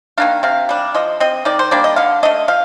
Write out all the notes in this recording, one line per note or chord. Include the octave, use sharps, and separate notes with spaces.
D#3 A#3 D4 F5
C3 F5
G3 D4
F3 D#5
C4 D#5
D#3 D5
C5
G3 A#3 D4 D5
D#5
D3 F5
A3 D4 D#5
F3 F5